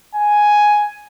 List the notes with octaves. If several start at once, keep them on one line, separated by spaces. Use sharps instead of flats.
G#5